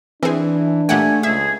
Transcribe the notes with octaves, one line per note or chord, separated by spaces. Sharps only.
E3 C4 D4 G#4
A#2 A3 G4 F#5 G#5
C#2 G#4 E5